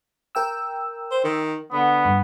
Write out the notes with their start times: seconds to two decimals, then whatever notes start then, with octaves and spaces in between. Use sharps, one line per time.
0.35 A#4 G5 E6
1.11 C5
1.24 D#3
1.72 D3 B3
2.05 G2